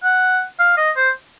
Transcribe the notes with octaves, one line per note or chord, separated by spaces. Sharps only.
F#5
F5
D#5
C5